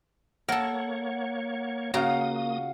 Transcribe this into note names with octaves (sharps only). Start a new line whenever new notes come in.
A#3 A4 A#4 C#5 F#5
C#3 A#3 F4 F#4 F5 A#5 D#6